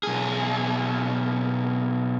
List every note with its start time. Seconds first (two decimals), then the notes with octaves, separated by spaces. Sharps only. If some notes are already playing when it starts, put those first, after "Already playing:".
0.03 B1 G#4